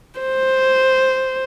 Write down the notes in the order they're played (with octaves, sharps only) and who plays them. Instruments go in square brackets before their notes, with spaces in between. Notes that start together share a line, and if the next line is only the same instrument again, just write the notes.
[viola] C5